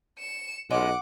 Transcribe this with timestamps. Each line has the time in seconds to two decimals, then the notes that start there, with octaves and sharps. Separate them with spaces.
0.18 C#7 E7
0.71 B1 G#3 C#4 F4 F#5 D6